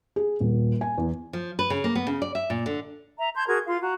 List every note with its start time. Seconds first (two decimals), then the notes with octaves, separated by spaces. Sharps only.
0.16 G#4
0.40 D#1
0.81 G#5
0.98 E2
1.33 F3
1.59 B4
1.70 C#3
1.84 A#3
1.95 B3
2.07 C#3
2.22 D5
2.35 E5
2.50 A#2
2.66 D3
3.18 E5 A#5
3.35 A5 C6 G6 G#6
3.47 F#4 G#4 A#4 G#6
3.66 F4 F5 C6
3.81 F#4 A#5